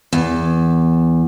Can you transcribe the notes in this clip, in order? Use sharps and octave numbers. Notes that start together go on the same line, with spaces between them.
E2